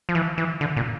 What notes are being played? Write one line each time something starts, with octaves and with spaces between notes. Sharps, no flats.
F3
E3
E3
D3
A#2